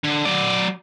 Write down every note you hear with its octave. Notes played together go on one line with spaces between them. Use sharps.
D3
F#3 D5